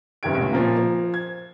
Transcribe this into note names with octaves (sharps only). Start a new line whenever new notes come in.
F#1 G2 D#3 G4 G#6 D7
C#2 A2
A#2 F3 A#3
F3
G#6